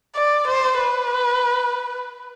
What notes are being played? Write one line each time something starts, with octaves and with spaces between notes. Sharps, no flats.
D5
C5
B4